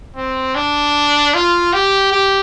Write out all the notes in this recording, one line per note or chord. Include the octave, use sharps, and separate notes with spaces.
C4
D4
F4
G4
G4